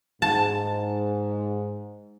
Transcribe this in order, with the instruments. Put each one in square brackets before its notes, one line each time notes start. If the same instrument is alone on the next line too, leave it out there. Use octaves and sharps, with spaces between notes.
[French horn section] G#2 [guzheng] A5